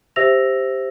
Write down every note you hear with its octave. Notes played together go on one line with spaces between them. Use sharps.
G4 C5 E5 E6 A#6 F7